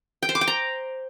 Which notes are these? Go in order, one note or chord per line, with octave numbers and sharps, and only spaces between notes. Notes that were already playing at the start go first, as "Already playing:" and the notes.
G5
C5
D6
G5
A#5